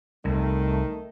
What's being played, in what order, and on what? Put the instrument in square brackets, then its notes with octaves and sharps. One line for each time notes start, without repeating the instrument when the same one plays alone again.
[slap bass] C2 [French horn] D#3 [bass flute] A3